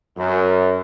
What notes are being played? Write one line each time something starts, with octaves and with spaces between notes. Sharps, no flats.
F#2